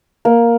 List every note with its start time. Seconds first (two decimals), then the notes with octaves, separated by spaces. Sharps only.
0.25 A#3